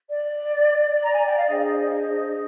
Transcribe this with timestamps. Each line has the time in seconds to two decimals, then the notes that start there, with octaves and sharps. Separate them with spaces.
0.09 D5
1.02 A#5
1.14 G#5
1.25 G5
1.36 F5
1.47 D4 G#4 C5 D#5